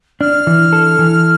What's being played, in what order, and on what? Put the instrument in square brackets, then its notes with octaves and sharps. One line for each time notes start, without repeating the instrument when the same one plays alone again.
[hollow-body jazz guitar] D4 [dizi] F6
[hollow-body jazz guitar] E3
A4
E3